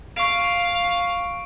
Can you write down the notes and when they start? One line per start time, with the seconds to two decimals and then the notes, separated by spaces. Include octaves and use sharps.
0.16 F5 C#6 D7